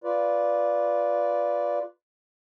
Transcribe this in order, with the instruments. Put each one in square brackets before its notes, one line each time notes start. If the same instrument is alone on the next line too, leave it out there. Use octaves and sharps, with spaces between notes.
[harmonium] F4 B4 D5